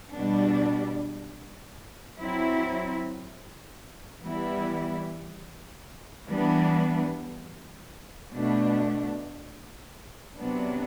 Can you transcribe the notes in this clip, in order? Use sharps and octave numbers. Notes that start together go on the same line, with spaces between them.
B2 G3 D4
F#3 C4 E4
E3 G3 B3 E4
E3 G3 B3 D4
B2 A3 D4
C3 F#3 B3 D4